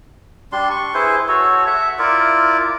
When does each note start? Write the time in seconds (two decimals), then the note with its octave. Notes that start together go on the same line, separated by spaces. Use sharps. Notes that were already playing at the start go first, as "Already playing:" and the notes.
0.52 G3 D4 C6
0.70 C#6
0.94 E4 G#4 B4 C5
1.28 F#4 A4 C#5
1.67 E5 F#5
1.99 E4 F4 A#4 D5